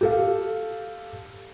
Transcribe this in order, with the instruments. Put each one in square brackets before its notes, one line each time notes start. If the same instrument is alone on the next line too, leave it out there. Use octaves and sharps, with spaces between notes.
[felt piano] G4 A4 F5